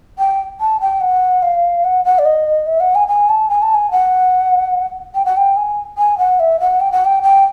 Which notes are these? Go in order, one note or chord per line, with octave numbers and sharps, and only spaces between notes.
G5
A5
G5
F#5
F5
F#5
F#5
D5
D#5
E5
F#5
G#5
G#5
A5
G#5
A5
G#5
F#5
G5
F#5
G5
G#5
G#5
F#5
E5
F#5
G5
F#5
G5
G5